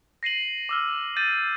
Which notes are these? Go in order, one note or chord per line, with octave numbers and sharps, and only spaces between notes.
A#6 C7 D#7 F#7
D6 E6 F6
G6 A6 D#7